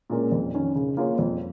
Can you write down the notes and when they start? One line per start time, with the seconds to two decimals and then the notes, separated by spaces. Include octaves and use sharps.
0.10 A#2 G#3 C#4 A#4
0.32 F2
0.54 D#3 C#4
0.75 C#3
0.97 A#3 F4 G#4 C#5
1.19 F2